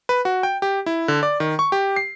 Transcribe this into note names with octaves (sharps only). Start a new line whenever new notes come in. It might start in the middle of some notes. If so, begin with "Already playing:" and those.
B4
F#4
G5
G4
E4
D3
D5
D#3
C#6
G4
C7